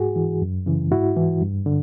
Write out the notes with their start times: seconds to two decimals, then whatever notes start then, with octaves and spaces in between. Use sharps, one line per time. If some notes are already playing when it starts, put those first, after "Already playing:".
Already playing: G#2 F#4 G#4
0.16 E3
0.42 F#2
0.66 C#3 E3
0.92 G#2 E4 F#4
1.17 E3
1.41 G2
1.66 D3